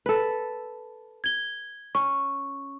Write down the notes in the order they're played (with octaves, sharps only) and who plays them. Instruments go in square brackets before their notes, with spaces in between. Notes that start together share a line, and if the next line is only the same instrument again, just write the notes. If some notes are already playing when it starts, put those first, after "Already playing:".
[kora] A4 B4
[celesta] G#6 G7
[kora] C#4 [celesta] C#6